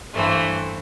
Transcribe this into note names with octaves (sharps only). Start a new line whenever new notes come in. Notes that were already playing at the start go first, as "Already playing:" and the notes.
G2 E3 A3 C5